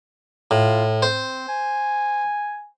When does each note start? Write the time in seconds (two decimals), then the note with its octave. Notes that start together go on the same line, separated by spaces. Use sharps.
0.51 A2 F4
1.02 C4 C5
1.48 G#5